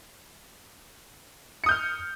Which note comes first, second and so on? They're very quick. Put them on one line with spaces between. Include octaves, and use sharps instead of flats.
C#7 D#6 G6 F6